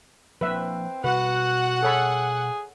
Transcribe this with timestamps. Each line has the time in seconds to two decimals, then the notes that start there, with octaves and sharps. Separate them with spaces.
0.41 F3 A#3 C4 D4 B4 E5
1.04 B2 G3 F#4 B4 F#5
1.83 G#4 A4 C#5 B5